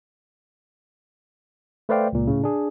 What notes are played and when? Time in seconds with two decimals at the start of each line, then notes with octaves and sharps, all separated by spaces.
1.89 A3 B4 C5 D5 F5 G5
2.13 C#2 A#2
2.27 A2 C#3
2.44 D4 G#4